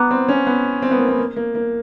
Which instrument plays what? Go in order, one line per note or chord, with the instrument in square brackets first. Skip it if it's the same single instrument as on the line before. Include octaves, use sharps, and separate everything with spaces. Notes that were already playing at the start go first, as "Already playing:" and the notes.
Already playing: [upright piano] B3 [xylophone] F#5 A#5 D6 F#6
[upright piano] C4
C#4
B3
C4
B3
A#3
B3
A#3
A#3
A#3